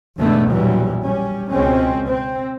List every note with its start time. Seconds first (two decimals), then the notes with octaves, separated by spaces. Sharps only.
0.18 E2 G#2 B2 D3 A3 B3
0.49 A#1 E2 E3 F#3 G3
1.02 G3 C#4
1.50 C#2 B2 G#3 C4 C#4
2.07 C4